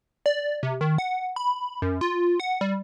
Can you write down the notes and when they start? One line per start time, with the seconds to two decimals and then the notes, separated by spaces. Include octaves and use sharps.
0.26 D5
0.63 C3
0.81 D#3
0.98 F#5
1.36 B5
1.82 F#2
2.01 F4
2.40 F#5
2.61 G3